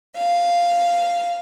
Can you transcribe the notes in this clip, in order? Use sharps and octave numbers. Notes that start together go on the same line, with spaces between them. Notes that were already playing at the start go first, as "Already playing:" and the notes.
F5